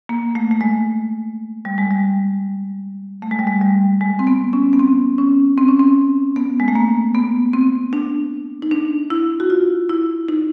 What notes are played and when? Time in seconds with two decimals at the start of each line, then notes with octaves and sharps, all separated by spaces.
0.09 A#3
0.35 A3
0.51 A3
0.61 G#3
1.65 G3
1.78 G#3
1.91 G3
3.22 A3
3.31 G#3
3.39 G3
3.47 G#3
3.61 G3
4.01 G#3
4.19 C4
4.27 B3
4.53 C#4
4.73 B3
4.79 C4
5.18 C#4
5.58 C4
5.68 C#4
5.80 C4
6.36 B3
6.60 G#3
6.68 A3
6.75 A#3
7.15 B3
7.53 C4
7.93 D4
8.62 D#4
8.71 D4
9.10 E4
9.40 F#4
9.50 F4
9.89 E4
10.28 D#4